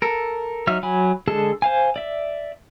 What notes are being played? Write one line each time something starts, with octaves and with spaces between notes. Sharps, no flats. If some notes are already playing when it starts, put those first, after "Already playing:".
A4 A#4
F#3 D#4 E5 F6
F#3 G#5 B5
D3 G#3 G#4 A4 A5
C5 F5 G#5
D5 E5